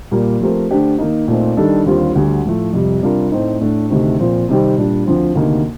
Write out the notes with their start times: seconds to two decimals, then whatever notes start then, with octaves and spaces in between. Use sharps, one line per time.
0.11 A#2 G3 A#3
0.41 F3 A3 C4 G4 A#4
0.69 D3 A3 D4 G4 C5
0.98 D#3 A#3 D#4
1.28 A#2 A3 C4 D#4
1.57 D#3 G3 D4 A4
1.86 D#2 D3 G3 C4 F4
2.15 D2 D3 G3
2.45 A2 F3 A3
2.73 F2 C3 G3
3.02 C3 G3 D4 F4 A#4
3.32 A2 A3 C4 D#4
3.61 A2 A3 D4
3.90 D2 C3 D#3 A3 C4
4.19 A#2 F3 C4
4.49 C3 D#3 G3 C4 G4
4.78 A#2 G3 D4
5.06 D2 D3 F3 C4
5.36 D2 C3 D#3 A#3